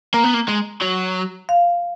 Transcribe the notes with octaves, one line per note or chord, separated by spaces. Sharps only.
A#3 A#5
B3
A#3
G#3
F#3
F5